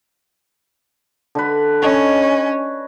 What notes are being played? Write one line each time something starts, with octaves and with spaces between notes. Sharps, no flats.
D3 B4
C#4 C#5 D#5